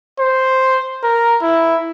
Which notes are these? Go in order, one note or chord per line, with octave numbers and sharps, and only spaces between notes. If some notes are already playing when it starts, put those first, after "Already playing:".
C5
A#4
E4